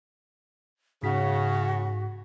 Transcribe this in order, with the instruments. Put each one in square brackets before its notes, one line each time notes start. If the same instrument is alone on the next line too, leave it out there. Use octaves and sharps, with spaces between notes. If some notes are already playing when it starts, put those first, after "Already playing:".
[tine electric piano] G#2 B6 [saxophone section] C#3 [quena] F#4